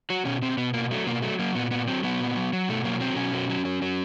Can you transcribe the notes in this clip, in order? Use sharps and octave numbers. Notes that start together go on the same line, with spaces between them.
F#3 F#4
B2 C#4
B2 C4
B2 B3
B2 A#3
F#3 A3
B2 A#3
F#3 A3
F#3 A#3
A#2 B3
A#2 B3
F#3 C4
F#3 B3
A#2
F#3
F#3
B2 A3
F#3 A#3
F#3 C4
B2 C#4
F#3
F#3
F#3
F#3